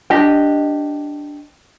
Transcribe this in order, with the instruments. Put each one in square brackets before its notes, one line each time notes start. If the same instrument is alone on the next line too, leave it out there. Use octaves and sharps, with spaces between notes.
[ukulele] D4 G4 D#5 G5